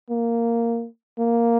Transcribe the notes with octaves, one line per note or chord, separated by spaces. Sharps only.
A#3
A#3